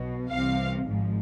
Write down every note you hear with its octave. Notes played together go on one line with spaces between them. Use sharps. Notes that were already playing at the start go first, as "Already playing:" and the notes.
Already playing: B1 B2
C2 C3 E3 F5
G#1 G#2 F3